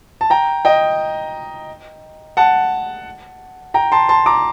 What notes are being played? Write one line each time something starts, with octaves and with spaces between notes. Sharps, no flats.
A5
G5 A#5
D#5 G5
F#5 A5
G5 A#5
A5 C6
A5 C6
A#5 D6